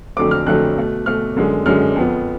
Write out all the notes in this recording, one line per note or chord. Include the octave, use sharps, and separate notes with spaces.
F2 D3 F#3 A3 D6
F6
F2 D3 F#3 A3 F#6
B2 A3
B2 A3 F6
F#2 D3 G#3
F#2 D3 G#3 F6
F2 F3 B3